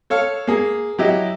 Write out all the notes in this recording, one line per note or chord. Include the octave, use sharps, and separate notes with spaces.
A4 C#5 F5
A#3 G#4
F#3 E4 G4 D#5